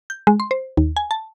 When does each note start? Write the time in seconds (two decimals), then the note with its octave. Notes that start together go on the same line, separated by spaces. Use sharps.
0.10 G6
0.27 G#3
0.40 C6
0.51 C5
0.77 D#2
0.97 G#5
1.11 A5